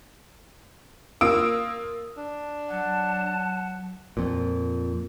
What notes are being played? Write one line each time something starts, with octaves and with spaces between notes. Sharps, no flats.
A#3 F4 D#6 E6 D7
D4
F#3 F#5 A5
F2 A#2